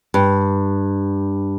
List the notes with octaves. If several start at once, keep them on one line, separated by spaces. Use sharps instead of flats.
G2